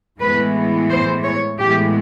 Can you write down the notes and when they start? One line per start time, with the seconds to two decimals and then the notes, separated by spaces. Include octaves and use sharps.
0.21 A2 E3 G#3 B3 B4
0.89 C5
1.24 C#5
1.59 A2 E3 G#3 B3 G4